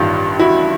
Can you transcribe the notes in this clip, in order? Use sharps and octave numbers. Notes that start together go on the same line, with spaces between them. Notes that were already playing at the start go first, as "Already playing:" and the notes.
Already playing: A1 G2 D#3 F4 G4
E4 F#4